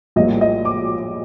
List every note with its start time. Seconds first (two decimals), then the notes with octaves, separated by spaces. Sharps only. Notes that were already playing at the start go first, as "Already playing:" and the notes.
0.16 A#1 A2 G3 A#3 D#5
0.41 D#5
0.65 D6